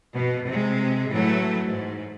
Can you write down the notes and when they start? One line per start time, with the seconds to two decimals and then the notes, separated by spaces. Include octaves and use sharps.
0.14 B2
0.46 C3 G#3
1.10 A2 E3 F#3 A3
1.65 G#2